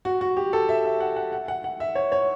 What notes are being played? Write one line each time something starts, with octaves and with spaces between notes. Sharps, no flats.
F#4
F#4
G4
A4
E5
E5
F#5
F#5
F#5
F#5
F#5
E5
C#5
C#5